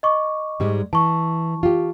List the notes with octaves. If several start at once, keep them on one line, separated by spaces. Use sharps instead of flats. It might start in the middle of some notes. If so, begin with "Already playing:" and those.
D#5 C#6 D6
G#2 G3 G#3
E3 A5 C#6
F4 G4